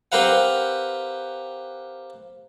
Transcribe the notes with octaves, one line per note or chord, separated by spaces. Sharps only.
C4 G4 A#4 B4 F5 F#5